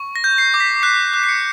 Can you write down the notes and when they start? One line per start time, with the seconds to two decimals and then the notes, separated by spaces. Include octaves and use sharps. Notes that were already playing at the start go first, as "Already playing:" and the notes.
Already playing: C#6
0.16 A#6
0.24 G6
0.38 C7
0.54 D6
0.60 B6
0.83 F#6 C7
1.13 F#6
1.24 C7
1.29 C#7